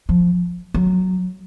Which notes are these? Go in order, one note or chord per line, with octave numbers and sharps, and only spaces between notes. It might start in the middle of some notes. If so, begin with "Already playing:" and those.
F3
F#3